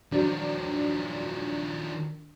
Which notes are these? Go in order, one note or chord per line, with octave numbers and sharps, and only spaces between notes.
D#3 F3 F#3 D4